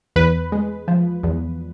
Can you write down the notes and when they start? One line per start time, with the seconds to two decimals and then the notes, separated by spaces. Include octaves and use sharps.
0.16 E2 B4
0.52 G#3
0.88 F3
1.23 E2